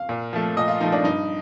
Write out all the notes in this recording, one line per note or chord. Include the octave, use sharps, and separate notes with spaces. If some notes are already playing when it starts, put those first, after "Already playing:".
Already playing: F5
A#2
F3 A3
A#2 D#5
F4
F3 A3 D#4
D4
G2 D#4